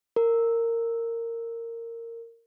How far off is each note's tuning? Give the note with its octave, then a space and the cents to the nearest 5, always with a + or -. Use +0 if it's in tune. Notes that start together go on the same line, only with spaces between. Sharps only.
A#4 -15